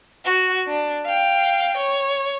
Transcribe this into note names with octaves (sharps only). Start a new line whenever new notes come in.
F#4
D4
F5 G5
C#5